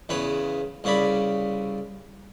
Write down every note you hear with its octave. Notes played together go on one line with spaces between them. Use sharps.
E2 C#3 B4 C#5
C2 C#3 C#5 D5 B5